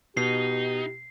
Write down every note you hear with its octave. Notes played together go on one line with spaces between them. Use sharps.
B2 D#4 G4 C7